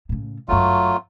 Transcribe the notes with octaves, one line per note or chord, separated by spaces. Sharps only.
A2 C#3
G1 F#2 F#3 A3 F4